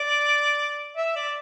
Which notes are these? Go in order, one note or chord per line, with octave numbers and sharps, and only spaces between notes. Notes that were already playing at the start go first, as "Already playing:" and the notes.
Already playing: D5
E5
D5